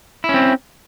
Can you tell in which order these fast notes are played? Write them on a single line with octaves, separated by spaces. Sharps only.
E4 C#4 C4